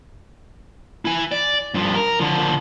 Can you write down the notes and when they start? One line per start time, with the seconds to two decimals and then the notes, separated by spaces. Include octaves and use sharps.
1.05 E4 G#5
1.32 D5
1.74 G2 F3
1.95 A#4
2.19 D3 F3